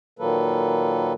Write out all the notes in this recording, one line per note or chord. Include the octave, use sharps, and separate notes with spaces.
A#2 D#3 F#3 A#3 A4 B4